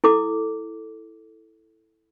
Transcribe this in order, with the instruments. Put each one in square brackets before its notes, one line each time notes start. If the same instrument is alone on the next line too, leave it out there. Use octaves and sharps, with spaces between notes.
[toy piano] E4 A4 D6